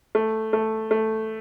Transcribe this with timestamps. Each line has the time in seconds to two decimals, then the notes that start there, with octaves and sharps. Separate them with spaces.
0.15 A3
0.53 A3
0.91 A3